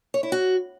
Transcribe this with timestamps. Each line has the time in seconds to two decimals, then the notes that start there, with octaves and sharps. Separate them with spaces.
0.14 C#5
0.23 E4
0.32 F#4